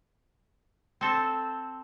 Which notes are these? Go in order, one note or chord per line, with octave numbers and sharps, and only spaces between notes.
C4 A4 C5